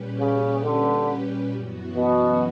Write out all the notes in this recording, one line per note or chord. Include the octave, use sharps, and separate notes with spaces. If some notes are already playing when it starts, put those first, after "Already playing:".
Already playing: A#2 G3 C#4 G4 B4
C#3
D3
F#2 E3 B3 F#4
B2